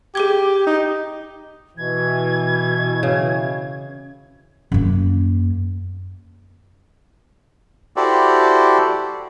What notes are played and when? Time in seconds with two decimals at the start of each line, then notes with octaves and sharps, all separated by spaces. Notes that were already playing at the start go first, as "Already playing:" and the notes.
0.15 G4 G#4 D6 G#6
0.67 D#4
1.78 B2 E3 G#6
3.03 C#3
4.72 F#2 A#3
7.96 E4 F#4 G4 A4 C5 D5